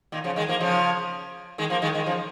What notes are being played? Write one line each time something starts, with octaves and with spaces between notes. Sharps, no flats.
A#2 D#3
C#3 F3
D#3 G#3
F3 A#3
C#3 F3
D#3 G#3
F3 A#3
D#3 G#3
D#3 G#3
C#3 F3